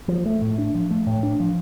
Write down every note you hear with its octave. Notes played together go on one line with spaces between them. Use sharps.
F3
A3
A2
D4
F3
A3
A2
D4
F3